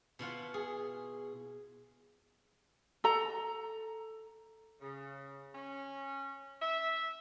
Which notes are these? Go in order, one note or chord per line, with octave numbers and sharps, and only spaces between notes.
B2 E4 F4 F#5
G#4
A4 A#5
C#3
C#4
E5